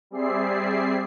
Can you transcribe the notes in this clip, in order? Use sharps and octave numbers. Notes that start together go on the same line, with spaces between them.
G3 C4 G#4 D5 E5 C7